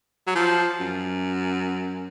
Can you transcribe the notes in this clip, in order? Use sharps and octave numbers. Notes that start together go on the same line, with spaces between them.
F#3
F3
F#2